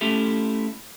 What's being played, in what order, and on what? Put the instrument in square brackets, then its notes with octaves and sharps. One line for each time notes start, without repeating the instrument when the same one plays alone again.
[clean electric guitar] A3 C#4 E4 G4 A4